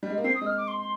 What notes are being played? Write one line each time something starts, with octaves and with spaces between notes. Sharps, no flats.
G3
G#3
A#3
C4 C7
D#6
G#3
F6
D6
C6
C6